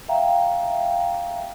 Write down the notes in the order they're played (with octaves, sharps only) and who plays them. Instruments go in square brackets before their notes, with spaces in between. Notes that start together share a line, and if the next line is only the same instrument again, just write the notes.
[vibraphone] E5 F5 G5 A#5